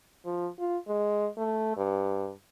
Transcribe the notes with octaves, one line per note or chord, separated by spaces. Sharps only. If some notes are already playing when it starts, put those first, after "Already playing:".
F3
F4
G#3
A3
G2